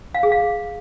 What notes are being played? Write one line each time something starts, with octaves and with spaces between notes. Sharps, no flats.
F5
G#4
F5